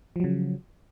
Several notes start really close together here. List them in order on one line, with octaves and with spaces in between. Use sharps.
F3 F#3 C#3